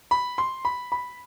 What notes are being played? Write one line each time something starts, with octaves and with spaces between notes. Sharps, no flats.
B5
C6
B5
B5